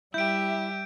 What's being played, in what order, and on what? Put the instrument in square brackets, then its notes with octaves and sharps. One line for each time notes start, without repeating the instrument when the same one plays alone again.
[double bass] G3 [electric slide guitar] E4 [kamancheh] G4 E5 [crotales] G6 D7